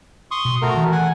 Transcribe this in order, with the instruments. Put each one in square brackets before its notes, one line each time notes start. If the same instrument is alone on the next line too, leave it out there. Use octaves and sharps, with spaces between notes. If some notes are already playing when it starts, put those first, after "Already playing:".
[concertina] C6 C#6 D#6
[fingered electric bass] B2
[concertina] A3 F#4 A#4
[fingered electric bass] D#3 E3
[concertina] F#5 G#5